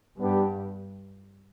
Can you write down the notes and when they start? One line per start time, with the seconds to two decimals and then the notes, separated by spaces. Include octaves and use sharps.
0.17 G2 G3 B3 D4 G4